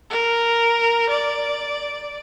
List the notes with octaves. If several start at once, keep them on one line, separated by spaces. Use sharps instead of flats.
A#4
D5